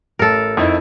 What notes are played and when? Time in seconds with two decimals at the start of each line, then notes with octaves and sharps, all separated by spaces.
0.19 A1 A4 A#4
0.57 F2 D#4 E4